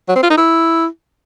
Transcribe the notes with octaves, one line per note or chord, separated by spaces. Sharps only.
F#3
C4
F4
D#4
E4